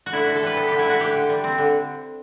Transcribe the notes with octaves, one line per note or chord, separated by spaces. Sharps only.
F#4
D3 E4
D3 F#4
A4
G3 B4
B3 A4
D3 G4
E4
D3 F#4
D3 G4
D3
G3
C4
D3